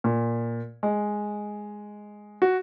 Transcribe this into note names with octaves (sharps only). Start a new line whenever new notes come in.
A#2
G#3
F#4